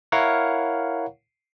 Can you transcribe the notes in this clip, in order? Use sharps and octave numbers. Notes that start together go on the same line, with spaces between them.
E4 A#4 C#5 F5 F#5